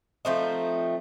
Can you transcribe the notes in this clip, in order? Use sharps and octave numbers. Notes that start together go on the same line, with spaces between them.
F3 A3 C4 D#4